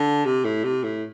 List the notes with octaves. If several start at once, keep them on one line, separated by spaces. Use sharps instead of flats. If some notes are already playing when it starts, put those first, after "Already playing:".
Already playing: D3
C3
A2
C3
A2